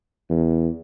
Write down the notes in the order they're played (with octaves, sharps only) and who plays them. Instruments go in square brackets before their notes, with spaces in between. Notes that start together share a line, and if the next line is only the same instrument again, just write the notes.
[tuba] E2